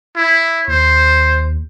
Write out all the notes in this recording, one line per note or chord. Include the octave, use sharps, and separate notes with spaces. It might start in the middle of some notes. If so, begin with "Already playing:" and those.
E4
D#2 C5